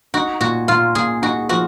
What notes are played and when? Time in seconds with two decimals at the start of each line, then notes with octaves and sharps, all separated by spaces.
0.14 D#4 F#4
0.41 A#2 F#4
0.68 A#2 F4
0.95 A#2 G#4
1.22 D#4 F#4
1.49 F3 F#4